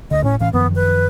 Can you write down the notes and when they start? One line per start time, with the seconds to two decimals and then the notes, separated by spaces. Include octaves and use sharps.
0.11 D2 D3 D#5
0.24 A2 C#4
0.40 A2 E3 C#4 F5
0.53 F#2 D#3 F3 B3
0.76 B4